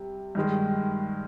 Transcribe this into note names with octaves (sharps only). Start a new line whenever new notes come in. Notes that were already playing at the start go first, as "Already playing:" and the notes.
Already playing: C3 G3
G2 D#3 G#3